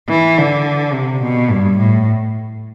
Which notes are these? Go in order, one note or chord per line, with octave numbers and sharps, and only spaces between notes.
E3
D3
C3
B2
G2
A2